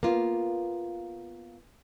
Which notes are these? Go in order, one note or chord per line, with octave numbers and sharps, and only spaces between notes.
A#3 B3 F4